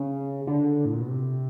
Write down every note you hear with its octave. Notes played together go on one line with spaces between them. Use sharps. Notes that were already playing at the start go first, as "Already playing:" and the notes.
Already playing: C#3
D3
A2
A#2
B2
C3